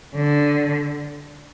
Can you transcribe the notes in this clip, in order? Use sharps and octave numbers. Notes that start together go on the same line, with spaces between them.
D3